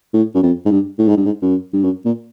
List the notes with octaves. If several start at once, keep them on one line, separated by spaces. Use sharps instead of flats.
A2
F#2
F2
G#2
G2
A2
G#2
G2
G#2
F#2
G2
F#2
A#2